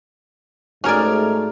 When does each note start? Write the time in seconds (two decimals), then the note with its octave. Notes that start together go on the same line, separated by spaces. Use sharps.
0.84 G#2 A3 C#4 F#4 G#4 A#4 D5